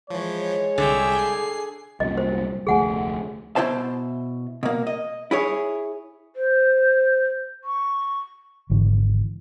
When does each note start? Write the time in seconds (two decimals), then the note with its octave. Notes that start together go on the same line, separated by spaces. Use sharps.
0.10 E3 F3 G#3 C#5
0.78 C2 D3 G#4 E5 G5
1.19 C7
2.00 C2 F#2 A#2 D#5
2.17 C5
2.67 F1 D2 A3 G#4 F#5 G#5
3.56 B2 E4 C5 A5
4.63 B2 A#3
4.87 D#5
5.31 E4 G#4 C#5
6.36 C5
7.64 C#6
8.70 G#1 G#2 D3 E3